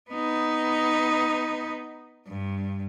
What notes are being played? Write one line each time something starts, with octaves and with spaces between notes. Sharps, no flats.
B3 D#4
G2